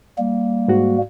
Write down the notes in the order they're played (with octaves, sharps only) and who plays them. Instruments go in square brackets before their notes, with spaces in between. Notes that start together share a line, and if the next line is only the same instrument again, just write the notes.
[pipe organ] G3 A#3
[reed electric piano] G#2 F#4